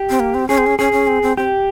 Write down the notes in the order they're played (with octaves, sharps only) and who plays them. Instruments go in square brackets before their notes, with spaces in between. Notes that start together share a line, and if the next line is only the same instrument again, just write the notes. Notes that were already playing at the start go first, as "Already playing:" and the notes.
Already playing: [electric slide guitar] G4
[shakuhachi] C4
A#3
C4
[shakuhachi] C#4 [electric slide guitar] G#4
[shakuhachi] C4
C#4
[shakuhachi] C#4 [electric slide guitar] G#4
[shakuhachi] C#4
C4
C4
[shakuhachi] C4 [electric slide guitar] G4